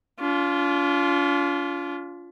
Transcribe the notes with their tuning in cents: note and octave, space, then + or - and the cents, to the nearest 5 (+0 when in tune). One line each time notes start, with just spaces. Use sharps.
D4 -45 F4 +0